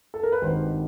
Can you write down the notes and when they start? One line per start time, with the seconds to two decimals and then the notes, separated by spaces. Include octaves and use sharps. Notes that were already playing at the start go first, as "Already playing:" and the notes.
0.14 A4
0.23 A#4
0.32 B4
0.42 G#1 G2 D#3 C5